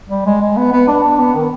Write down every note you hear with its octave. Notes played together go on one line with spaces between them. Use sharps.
G3
G#3
G#3
B3
B3
D4
D4
B3
D#3